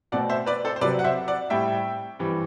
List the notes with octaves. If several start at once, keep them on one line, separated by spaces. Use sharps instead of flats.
B2 A3 C4 D5 F#5
C5 E5
B4 D5
A4 C5
C5
C3 F#3 C4 B4 D5
F#5
C5 E5
D5 F#5
A2 G3 C4 E5 G5
G2 E3 G3 C4